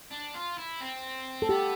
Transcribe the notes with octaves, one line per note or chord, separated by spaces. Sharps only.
D4
F4
E4
C4
A4
B3 G4